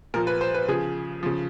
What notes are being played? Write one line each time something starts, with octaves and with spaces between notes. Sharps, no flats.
A#2 F3 A#4
B4
C5
B4
C#3 F3 G#4
C#3 F3